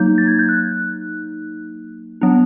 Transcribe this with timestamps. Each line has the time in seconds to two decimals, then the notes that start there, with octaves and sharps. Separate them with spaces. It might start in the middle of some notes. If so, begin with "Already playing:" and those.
Already playing: F#3 A#3 D#4 G6
0.18 A6
0.28 G#6
0.39 G6
0.49 F#6
2.21 F#3 B3 D4